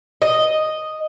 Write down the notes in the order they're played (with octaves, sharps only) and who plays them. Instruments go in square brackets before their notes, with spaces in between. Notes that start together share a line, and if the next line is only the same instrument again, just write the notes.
[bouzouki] D#5